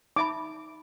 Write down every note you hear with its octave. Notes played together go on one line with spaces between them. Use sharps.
D#4 E5 B5 D6